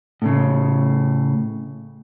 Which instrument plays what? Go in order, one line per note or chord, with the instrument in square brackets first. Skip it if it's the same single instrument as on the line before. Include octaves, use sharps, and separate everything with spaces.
[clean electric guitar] A2 C#3